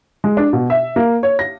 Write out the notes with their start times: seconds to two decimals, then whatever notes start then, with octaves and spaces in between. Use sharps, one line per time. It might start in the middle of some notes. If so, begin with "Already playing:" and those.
0.24 G#3
0.37 D4
0.53 B2
0.70 E5
0.96 A#3
1.23 C#5
1.39 A#6